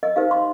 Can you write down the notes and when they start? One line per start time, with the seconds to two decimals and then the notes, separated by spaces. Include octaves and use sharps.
0.03 D#5
0.16 D#4 G4 C5 F5
0.31 C6